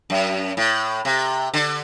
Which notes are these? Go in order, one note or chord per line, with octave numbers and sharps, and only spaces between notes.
F#2
A2
C3
D3